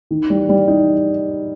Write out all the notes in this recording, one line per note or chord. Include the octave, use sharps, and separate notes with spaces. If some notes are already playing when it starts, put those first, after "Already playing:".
D#3
G3
G3
D#4